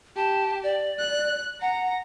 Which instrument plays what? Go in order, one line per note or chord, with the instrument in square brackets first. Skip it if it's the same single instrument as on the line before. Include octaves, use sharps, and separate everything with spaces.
[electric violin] G4 [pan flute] A5
[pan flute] D5
[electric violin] F#6
[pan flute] F#5 [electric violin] A#5